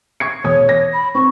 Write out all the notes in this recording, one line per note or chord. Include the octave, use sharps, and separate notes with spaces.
C#6 G#6 C#7
E1 C#5 D#6 G#6
A#6
B5
C4 C#6